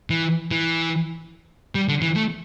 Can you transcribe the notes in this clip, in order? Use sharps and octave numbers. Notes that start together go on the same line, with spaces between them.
E3
E3
G3
D3
E3
A3